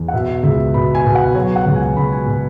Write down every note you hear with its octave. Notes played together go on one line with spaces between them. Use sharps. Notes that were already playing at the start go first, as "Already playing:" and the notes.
Already playing: E2
F#5
B2 E5
C#2 E5
B2 B5
G#5
B2
F#5
F#3 C#5
F#5
C#2
G#5
C#2 B5
G#5
B2